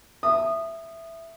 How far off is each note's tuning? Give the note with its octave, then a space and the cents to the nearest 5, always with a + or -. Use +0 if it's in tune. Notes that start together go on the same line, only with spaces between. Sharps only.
E5 +5 D#6 -20